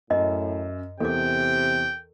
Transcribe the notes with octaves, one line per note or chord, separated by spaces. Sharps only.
F#2 A2 D#5
E2 C3 A4 A#4 G5 D6